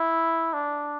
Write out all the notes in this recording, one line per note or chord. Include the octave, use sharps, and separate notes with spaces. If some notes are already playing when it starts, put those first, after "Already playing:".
Already playing: E4
D4